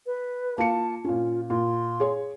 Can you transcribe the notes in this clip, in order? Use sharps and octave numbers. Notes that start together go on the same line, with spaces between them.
B4
A#3 F4 A5 C#7
A#2 C#4 F4
A#2 C6
G#4 C#5